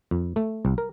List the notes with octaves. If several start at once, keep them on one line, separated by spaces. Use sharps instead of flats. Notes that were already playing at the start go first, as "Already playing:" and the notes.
F2
A3
C2
A#4